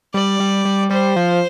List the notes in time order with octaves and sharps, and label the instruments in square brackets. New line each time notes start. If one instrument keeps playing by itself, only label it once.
[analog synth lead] G3 [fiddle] D5
[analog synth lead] G3
G3
[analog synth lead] G3 [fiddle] C5
[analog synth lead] F3